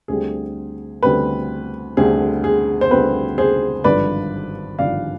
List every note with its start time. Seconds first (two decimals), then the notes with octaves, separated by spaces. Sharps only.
0.08 D2 D3 G3 C4 G#4
1.03 D2 D3 G3 C4 B4
1.97 D2 D3 G3 C4 G#4
2.44 G#4
2.81 C5
2.91 D2 D3 G3 C4 B4
3.38 G#4 C5
3.84 G#1 G2 D3 F3 B4 D5
4.78 G#1 G2 D3 F3 D5 F5